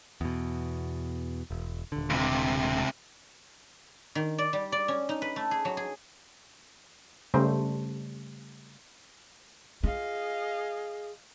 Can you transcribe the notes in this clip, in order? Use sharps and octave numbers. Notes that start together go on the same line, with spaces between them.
E2 B2
E1
D#1 D3
C#2 C3
D#3
D5
G3
D5
C#4
D#4
B4
A3
G#4
F#3
G#4
C#3 G3 A3 C5
F4 G#4 D#5 F5